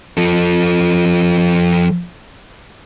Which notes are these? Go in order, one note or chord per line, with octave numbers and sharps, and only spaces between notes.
F3 A4